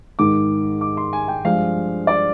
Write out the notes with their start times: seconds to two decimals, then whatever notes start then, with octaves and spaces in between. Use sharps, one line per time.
0.19 G#2 D#3 G#3 D6
0.81 D6
0.97 C6
1.13 G#5
1.28 G5
1.45 G2 F3 G#3 D4 F5
2.07 D5